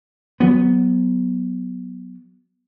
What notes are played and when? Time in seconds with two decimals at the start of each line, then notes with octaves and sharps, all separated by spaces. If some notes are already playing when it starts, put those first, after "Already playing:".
0.40 F#3 B3